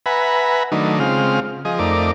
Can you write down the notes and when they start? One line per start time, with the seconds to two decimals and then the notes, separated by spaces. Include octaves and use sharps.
0.06 B4 E5 F#5 G#5 A#5 B5
0.72 D#3 F#3 A3 D4 D#4
1.00 C#3 G#3 C4 F4 F6
1.65 F3 G#4 D#5
1.79 F2 A3 D#4 A#4 D5 D6